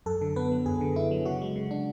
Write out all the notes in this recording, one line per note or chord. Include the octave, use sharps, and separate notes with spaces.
F#2 A4
D3
B3 B4
F#3
F#2 G#4
D3
B3 E4
F#3
C#3 F#4
G#3
C#3
D4